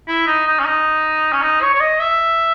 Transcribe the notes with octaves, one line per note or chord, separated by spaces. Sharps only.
E4
D#4
D#4
C#4
D#4
C#4
D#4
C#5
C#5
D#5
E5